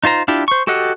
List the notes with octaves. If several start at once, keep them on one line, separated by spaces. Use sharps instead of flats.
D#4 F4 C5 A#5
D4 E4 F4 G4
C5 C#6
F#4 G4 A4 D#5 F#5